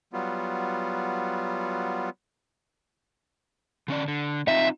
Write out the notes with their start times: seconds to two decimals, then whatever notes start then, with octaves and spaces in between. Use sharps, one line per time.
0.13 F#3 G3 B3 F4
3.88 D3 C#4 D5
4.08 D3
4.48 C4 D#4 F4 E5